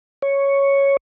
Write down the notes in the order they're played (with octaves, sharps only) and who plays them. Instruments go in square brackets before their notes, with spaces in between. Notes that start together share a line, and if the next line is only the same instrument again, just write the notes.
[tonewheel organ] C#5